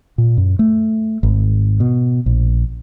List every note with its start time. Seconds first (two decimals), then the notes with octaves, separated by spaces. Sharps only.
0.18 A#2
0.37 F#2
0.59 A3
1.23 G#1
1.80 B2
2.26 A#1